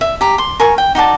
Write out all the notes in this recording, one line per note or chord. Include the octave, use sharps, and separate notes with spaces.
E5
G4 A#5
C6
A#4 G#5 C#6
G5
D#4 F#4 D5 A5